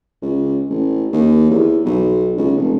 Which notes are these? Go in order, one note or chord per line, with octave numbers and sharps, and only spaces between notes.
C#2
A1
D#2
E2
B1
C#2
F1